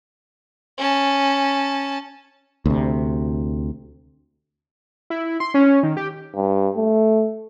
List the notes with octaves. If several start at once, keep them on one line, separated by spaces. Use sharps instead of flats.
C#4 A5
D2 C3
E4
C6
C#4
D#3
G4
G2
A3